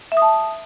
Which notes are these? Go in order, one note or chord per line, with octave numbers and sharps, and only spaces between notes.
E5
D#6
A5